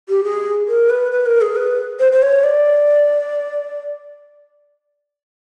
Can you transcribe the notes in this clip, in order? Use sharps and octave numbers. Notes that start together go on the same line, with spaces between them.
G4
G#4
A#4
B4
B4
A#4
G#4
B4
C5
C5
C#5
D5